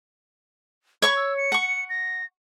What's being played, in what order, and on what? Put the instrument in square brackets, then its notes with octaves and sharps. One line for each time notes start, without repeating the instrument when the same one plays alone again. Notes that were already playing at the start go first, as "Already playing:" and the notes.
[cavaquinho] C#5 C#6 [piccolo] B5
[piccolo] E6
C#7
[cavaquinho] F#5 C#6
[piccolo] A#6